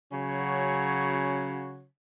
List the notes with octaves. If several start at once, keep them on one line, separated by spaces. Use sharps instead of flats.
C#3 F#3 C#4 F#4 C#5